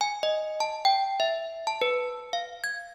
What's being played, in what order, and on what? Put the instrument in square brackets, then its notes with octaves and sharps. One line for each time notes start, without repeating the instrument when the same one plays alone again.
[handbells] G#5
D#5
A5
G5
E5
A5
B4
F5
G#6